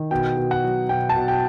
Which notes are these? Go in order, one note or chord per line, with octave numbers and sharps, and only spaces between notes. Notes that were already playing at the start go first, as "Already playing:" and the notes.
Already playing: D#3
B2 G5
B2
F#5
F#3
B2 G5
A5
B2
G5